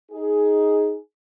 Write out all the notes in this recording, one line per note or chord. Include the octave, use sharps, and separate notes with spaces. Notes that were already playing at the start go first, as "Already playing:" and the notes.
D#4 G#4